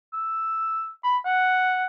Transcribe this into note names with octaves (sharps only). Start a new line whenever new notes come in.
E6
B5
F#5